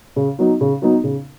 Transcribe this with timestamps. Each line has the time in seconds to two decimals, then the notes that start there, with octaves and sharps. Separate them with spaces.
0.16 C#3
0.39 F#3 B3 D#4
0.61 C#3
0.82 F#3 B3 D#4
1.04 C#3